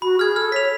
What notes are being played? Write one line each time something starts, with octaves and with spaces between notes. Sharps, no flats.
F#4 B5
G#4 F6 G#6
A4 F6
C#5 B6 F7